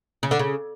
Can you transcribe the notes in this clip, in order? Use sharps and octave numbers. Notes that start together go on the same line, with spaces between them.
C#3
D3
C#3